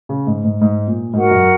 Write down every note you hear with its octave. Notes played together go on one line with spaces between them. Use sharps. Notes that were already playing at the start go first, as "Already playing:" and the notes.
C#3
G#2
G#2
G#2
A#2
G#2 F#4 A#4 F#5
F#2